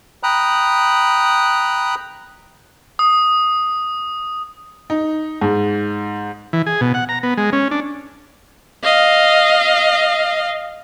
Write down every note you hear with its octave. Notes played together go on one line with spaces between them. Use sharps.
G5 A#5 B5 D#6 F#6
D#6
D#4
G#2
E3
G#4
B2
F#5
A#5
B3
G#3
C#4
D4
D#5 F5